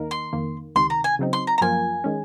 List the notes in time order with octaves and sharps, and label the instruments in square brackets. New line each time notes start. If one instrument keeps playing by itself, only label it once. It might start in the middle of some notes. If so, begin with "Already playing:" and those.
Already playing: [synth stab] D#2 D#3 A#3 D#4 A#4
[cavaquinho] C6
[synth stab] F2 D#3 A#3
[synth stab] C#2 C3 D#3 [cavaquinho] C6
[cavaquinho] A#5
G#5
[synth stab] C#3 F#3 C4 D#4
[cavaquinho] C6
A#5
A#5
[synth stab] F#2 F3 A#3 F4 A#4 [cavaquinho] G#5
[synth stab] D#3 G#3 C#4